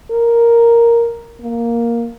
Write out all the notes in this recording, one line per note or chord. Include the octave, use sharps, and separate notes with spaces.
A#4
A#3